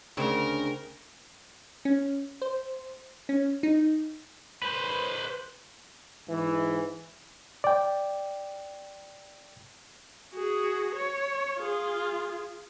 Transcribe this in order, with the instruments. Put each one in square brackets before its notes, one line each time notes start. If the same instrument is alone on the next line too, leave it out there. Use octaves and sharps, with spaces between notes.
[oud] D2 C#3 C4 [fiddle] A#4
[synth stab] C#4
C5
C#4
D#4
[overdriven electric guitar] B4 C5
[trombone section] G#2 E3
[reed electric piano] D5 G5
[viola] F#4 G#4
C#5
F4 G#4